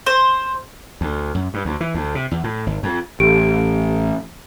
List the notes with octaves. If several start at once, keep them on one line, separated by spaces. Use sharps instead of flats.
C5
D2
F#2
G2
D2
E3
D2
C3
E2
A2
G#1
F2
A1 G4 D7